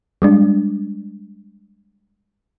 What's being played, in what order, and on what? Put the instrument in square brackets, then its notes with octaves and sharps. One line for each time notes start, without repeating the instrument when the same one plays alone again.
[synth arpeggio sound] G3 G#3 D4